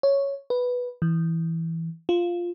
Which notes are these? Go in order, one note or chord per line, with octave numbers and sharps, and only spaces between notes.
C#5
B4
E3
F4